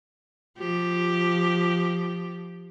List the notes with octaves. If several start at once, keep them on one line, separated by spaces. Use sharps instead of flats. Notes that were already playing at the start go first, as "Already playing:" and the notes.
F3 G4